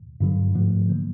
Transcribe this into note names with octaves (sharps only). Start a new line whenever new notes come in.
G2 D3 F#3
G#2 F3 A3
D3 F#3 A#3